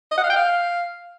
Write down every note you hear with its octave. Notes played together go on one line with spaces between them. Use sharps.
D#5
F#5
F5
G5
F5